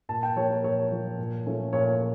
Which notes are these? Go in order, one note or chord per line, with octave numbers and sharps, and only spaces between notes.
A#2 A5
G5
F3 A#3 C#5
A#4
A#2 C#5
F3 A#3
A#2
F3 A3 C#4
A#2 C#5